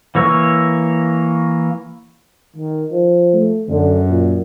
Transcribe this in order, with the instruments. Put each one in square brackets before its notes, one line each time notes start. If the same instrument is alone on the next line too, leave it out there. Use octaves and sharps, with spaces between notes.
[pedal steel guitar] E3 A#3 C#5 E6
[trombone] D#3
F3
[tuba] A3
[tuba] F#2 [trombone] D3
[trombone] A#2